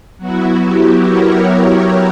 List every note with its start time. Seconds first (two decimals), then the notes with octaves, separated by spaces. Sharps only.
0.18 F#3 B3 E4 F#4
0.63 G4
1.07 A#4 C#5
1.52 A#4 C#5